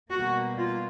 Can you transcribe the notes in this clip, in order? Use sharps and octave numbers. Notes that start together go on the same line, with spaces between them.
B2 G3 A#3 F#4
F4